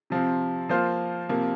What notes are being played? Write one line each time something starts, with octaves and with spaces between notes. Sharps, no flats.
C3 F3 C4
F3 A#3 F4 C5
C3 F3 A#3